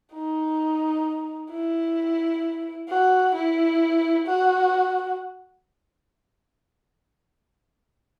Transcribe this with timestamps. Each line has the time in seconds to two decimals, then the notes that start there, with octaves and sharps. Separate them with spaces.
0.14 D#4
1.52 E4
2.89 F#4
3.35 E4
4.27 F#4